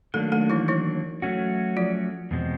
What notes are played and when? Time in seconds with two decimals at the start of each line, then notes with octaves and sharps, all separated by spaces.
0.14 D#3 F#3 A3 A#3 D4 A4
0.32 A3 A4
0.50 E3 E4
0.68 E3 E4
1.22 F#3 A3 C#4 F#4
1.77 F3 F4
2.31 E2 B2 G#3 C4